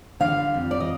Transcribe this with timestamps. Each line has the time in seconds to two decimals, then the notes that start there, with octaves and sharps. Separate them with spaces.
0.20 D3 F5
0.37 G3
0.54 F2
0.71 F2 D5
0.80 D#5